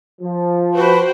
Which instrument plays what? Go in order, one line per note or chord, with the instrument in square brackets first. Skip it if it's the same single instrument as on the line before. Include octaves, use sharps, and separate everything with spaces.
[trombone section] F3
[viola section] F#4 C5 G5 [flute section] B4